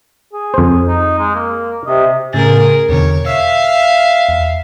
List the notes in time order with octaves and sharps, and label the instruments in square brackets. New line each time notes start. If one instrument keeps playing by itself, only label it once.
[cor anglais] G#4
[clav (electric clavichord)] F2 C5
[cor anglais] D#4
G#3
A#3
[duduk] C3 [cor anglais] D#5
[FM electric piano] A2 C#3 A6 [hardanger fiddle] G#4 A#4
[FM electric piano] E2 B2 D3 [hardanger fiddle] C#5
[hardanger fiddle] E5 F5 [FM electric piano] E6
[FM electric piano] E2